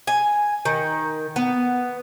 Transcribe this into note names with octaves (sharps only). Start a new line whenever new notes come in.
G#5
D#3
B3